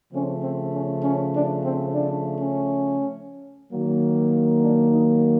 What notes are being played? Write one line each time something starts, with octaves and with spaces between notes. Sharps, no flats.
C#3 F3 A3 C4 C#4
C4
C#4
C#4
D4
C4
D4
C#4
D#3 F#3 A#3
D4
D#4